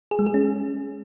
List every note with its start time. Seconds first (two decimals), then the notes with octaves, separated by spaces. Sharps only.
0.11 G#4
0.19 G#3
0.26 G#4
0.34 C#4